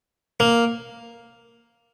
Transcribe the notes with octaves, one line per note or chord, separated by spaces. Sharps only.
A#3